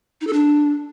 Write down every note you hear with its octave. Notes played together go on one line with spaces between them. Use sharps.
D#4
A4
D4